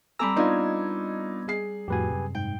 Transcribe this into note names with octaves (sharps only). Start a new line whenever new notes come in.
G3 C4 A4 G#5 A#5 B5 D6 E6
B3 D4 D#4 F4 D#5 G#6
G#4 C7
F2 A2 F#4 G4 B4 G#5
F#2 C3
G#2 G5